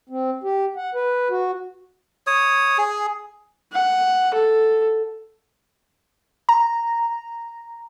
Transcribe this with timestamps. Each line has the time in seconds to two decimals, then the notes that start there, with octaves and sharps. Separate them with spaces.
0.09 C4
0.43 G4
0.76 F#5
0.95 B4
1.30 F#4
2.27 C#5 D#6
2.78 G#4
3.73 F#5
4.34 A4
6.49 A#5